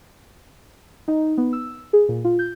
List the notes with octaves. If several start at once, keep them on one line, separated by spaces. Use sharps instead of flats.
D#4
B3
E6
G#4
A#2
F4
G6